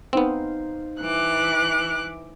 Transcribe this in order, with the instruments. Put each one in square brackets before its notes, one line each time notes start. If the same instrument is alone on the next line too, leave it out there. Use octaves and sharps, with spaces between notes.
[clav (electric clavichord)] B3 C4 [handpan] D#4 C5 F5
[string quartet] E3 D6 [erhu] F#6